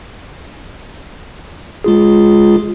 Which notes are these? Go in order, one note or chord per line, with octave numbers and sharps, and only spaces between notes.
G#3 F4 G#4